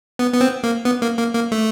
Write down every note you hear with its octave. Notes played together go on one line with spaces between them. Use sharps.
B3
B3
C4
A#3
B3
A#3
A#3
A#3
A3